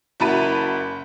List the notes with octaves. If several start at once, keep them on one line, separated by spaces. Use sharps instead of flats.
F#1 E4 F#4 A5 B5 D#7